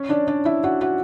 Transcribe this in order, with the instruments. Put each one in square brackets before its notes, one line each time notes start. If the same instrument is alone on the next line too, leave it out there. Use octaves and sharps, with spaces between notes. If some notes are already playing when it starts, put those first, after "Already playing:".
Already playing: [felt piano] C#4 C#5
D4 D5
D4 D5
E4 E5
F#4 F#5
F#4 F#5